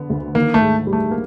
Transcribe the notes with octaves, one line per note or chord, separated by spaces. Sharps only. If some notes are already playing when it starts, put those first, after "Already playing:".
Already playing: D3 B3
D2
D#3 A#3
A3
G#2
G3
A3
A#3